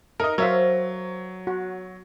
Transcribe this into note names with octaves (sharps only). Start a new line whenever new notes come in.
D#4 A#4 D#5
F#3 A#4 C5 C#5 E5 F5
F#4